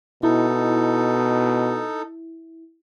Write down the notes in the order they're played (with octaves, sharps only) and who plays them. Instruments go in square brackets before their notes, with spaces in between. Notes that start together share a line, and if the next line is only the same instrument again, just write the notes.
[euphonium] B2 [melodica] D#4 A4 [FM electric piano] E4